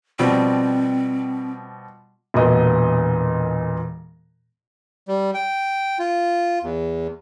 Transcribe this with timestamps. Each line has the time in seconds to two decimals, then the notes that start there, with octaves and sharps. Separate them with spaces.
0.19 B2 F3 G3 C4
2.34 E1 A#2 B3 D#5
5.08 G3
5.34 G5
5.99 F4
6.63 E2